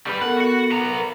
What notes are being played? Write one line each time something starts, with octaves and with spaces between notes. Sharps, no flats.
G3 B4
B3 A4 A#4 F#5
F#4 F#5
B3 A#5
A#4